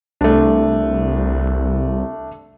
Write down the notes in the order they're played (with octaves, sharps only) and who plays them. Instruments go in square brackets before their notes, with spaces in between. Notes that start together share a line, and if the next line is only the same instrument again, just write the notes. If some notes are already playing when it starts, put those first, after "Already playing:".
[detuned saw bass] C2 [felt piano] A3 D4